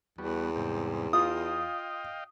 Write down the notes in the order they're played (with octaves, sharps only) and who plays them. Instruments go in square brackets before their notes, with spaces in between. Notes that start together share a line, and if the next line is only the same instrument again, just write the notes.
[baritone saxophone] E2 [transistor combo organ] G3 B3 F#4
[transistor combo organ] G#2 C3 G3
[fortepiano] F4 [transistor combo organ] D#5 F5 G5 [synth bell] D#6